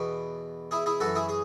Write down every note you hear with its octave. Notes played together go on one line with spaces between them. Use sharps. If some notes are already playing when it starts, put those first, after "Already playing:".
Already playing: E2 B2
E4 G#4
E4 G#4
F#2 E3 F#4 A4
E4 G#4
G#4